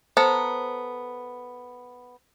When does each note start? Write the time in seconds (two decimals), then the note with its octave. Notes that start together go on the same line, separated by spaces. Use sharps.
0.17 B3 A4 C5 A#5